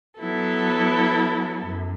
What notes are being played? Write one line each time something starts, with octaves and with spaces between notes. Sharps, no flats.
F#3 B3 E4 A4
F#2